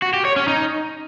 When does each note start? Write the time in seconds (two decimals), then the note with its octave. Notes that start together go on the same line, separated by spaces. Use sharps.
0.02 F#4
0.14 G4
0.25 C#5
0.36 C#4
0.48 D#4